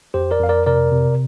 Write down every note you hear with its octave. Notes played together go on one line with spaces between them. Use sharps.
F2 G4 C5
A#4 D5
F2 F5
A#4 D5
C3 A#4 D5
C3